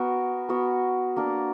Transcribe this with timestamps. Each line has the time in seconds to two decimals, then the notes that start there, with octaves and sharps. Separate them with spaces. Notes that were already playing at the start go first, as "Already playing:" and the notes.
Already playing: B3 F#4 A#4
0.49 B3 F#4 A#4
1.16 A#3 D4 A#4